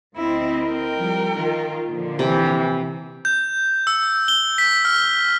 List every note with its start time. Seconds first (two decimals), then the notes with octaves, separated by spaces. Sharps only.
0.16 D2 C4 E4 D#5
0.62 A#4 G5
0.96 F3 G3
1.33 D#3 F4
1.87 A#2 D3 F3
2.19 C3 E3
3.25 G6
3.87 E6
4.28 G7
4.58 B6
4.85 F6